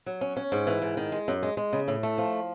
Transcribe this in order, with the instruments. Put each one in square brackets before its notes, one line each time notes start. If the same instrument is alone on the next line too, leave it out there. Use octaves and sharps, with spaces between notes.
[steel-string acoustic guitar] F#3
C#4
C#4
G#2
E3
G#2
D#3
G#3
F#2
G#3
G#3
C#3
A2
A3
F3